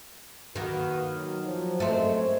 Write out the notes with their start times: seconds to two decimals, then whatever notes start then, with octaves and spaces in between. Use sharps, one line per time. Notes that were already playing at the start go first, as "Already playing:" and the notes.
0.56 D#3 A#3 F#4 B4
1.11 F#3
1.41 F3 F#3
1.80 F#2 G#3 A3 C4
2.16 C#5